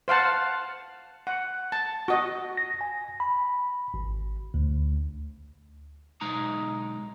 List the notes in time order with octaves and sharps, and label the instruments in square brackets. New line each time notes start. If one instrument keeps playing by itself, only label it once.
[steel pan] C5 F5 F#5 A5
F#5
A5
F#4 D#5
[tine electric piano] A#6
G#5
B5
G#1
D2
[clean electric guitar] B1 G#3 D#4 A#5